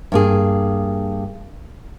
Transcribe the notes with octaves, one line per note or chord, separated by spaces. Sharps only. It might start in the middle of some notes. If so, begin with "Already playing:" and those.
G2 A#3 G#4